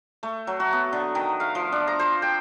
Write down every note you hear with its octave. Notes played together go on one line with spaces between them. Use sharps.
A3
F#3
F#4
B3
D3
D#3
F5
F3
D4
A#5
C5
G5